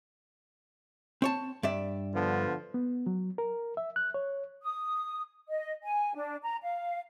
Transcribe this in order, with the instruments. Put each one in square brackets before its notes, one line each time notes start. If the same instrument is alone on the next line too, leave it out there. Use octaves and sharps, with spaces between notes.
[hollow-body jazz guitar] C4 C#5 A5
G2 D5 E5
[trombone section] D3 F3 B3
[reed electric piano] B3
F#3
A#4
E5
F#6
C#5
[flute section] D#6
D#5
G#5
D4
A#5
F5